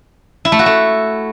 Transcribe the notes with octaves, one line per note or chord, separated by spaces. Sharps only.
E4
A3
F#4
A3